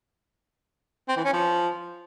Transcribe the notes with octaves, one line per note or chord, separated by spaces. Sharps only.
C4
E3
C#4
F3